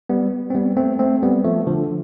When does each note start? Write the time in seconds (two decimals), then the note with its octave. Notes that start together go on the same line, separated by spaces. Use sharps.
0.09 G3 B3
0.50 C4
0.55 G3 B3
0.77 A3 C4
0.99 A3 C4
1.23 G3 B3
1.44 F3 A3
1.67 D3 F3